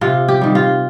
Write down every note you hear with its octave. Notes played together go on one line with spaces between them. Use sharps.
C3 F4
G4
D#3 G3
F4